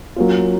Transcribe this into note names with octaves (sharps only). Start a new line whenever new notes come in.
F#3 A#3 C#4 F4